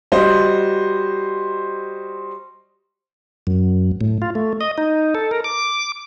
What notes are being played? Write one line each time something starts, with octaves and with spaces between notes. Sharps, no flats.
G3 F#4 C5 D#5
F#2
A2
F4
A3
D#5
D#4
A4
A#4
D6